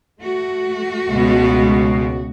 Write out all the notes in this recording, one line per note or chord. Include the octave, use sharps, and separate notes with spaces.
A3 F#4
C#2 B2